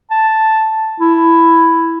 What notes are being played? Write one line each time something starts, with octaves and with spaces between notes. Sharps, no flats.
A5
E4